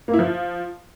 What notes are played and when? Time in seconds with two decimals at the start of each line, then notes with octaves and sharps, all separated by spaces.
0.08 A#3
0.13 E4
0.19 F3